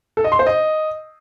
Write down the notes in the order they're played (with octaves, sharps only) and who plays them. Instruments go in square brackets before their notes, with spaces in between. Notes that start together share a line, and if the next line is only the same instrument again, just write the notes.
[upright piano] A4
D#5
C6
C5
D#5